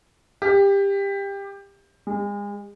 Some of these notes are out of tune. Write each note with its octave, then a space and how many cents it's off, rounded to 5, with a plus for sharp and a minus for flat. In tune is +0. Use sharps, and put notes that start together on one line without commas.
G4 +20
G#3 -35